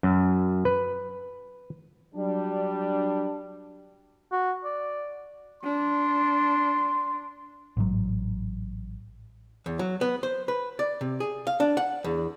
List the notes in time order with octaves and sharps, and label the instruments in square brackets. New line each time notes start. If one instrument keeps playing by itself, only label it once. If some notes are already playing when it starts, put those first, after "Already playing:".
[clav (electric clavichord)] F#2
B4
[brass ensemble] F#3 G3 D4
[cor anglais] F#4
D5
[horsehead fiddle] D4 [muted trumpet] C6
[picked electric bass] A1 G#2 F#3
[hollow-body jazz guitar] E2
F#3
B3
C5
B4
D5
C3
G#4
F5
D4
F#5
E2